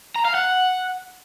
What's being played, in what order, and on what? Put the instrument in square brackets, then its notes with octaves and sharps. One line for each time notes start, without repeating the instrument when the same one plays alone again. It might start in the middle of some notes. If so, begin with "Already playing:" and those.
[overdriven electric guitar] A#5
F5
F#5